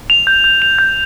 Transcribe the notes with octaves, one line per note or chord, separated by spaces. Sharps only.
F7
G6
G6
F7
G6